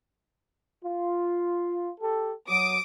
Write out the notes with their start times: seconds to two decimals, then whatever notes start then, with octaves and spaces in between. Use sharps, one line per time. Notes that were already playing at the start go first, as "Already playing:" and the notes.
0.84 F4
2.01 G4 A4
2.48 F#3 D6 D#6 D7